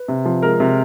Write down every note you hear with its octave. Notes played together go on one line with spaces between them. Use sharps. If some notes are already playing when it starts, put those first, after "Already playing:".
Already playing: B4
C3
F3
G#3 A#4
C3